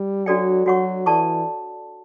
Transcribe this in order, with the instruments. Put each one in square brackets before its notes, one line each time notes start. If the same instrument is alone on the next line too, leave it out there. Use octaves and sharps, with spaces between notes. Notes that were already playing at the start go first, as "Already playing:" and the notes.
Already playing: [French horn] G3
[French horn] F#3 [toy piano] D4 F#4 A4 D5 G5
[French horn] F#3 [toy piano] F#4 C#5 F#5 C#6
[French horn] E3 [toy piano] A4 D5 A5 C#6